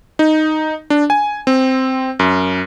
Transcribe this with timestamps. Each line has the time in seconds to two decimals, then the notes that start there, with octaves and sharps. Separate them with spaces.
0.19 D#4
0.90 D4
1.10 G#5
1.47 C4
2.19 F#2